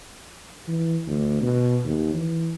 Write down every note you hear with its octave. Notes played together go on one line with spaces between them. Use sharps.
E3
D2
B2
D#2
E3